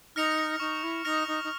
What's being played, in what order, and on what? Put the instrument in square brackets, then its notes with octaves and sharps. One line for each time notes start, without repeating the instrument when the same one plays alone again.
[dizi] D#4 [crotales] F6 A#6 C#7 F7
[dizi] D#4 [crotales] C#6
[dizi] E4
[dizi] D#4 [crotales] F6 A#6 C#7 F7
[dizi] D#4
D#4